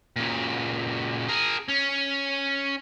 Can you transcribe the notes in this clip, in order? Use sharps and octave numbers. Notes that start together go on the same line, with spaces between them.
A#2 C#3
G#4 A#4
C#4